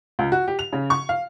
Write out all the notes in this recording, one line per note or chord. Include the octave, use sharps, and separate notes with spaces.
C#2
F#4
G4
F7
C#3
C#6
F5